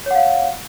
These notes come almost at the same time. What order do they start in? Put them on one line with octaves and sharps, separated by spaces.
C#5 F#5 F5